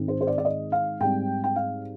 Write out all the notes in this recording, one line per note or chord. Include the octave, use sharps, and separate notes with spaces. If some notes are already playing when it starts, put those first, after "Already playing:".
Already playing: G#2 D#3 G#3 C4
C5
C5
D5
D5
D#5
F5
G#2 G3 C4 G5
G5
F5